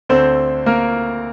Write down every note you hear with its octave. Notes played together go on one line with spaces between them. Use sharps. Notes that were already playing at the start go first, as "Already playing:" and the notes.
D2 D3 A3 C4 C5
A#3 A#4